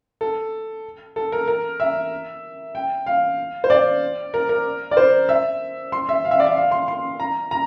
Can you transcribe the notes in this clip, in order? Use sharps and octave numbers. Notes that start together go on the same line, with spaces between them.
A4
A4
A#4
A#4
E5
G5
F5
C5
D5
A#4
A#4
D5
C5
E5
C6
E5
F5
E5
D5
E5
F5
C6
C6
A#5
A#5